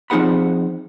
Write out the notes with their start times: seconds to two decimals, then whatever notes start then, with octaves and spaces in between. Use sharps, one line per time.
0.10 F3 C4 D#4 G#4 F#5 B5